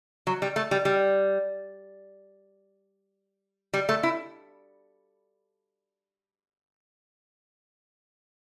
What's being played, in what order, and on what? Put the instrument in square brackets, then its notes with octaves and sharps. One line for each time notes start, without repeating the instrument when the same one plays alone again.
[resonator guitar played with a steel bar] F#3
G3
A3
G3
G3
G3
A3
E4